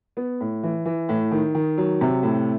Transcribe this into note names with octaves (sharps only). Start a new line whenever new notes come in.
B3
A2
E3
E3
A2
D#3
D#3
F#3
C3
A2